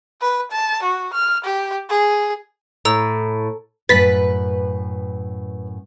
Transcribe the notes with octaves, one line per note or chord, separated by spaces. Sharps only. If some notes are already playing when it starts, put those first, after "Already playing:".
B4
A5
F#4
F6
G4
G#4
A2 A#5 E6
F#2 A2 B4 A6 B6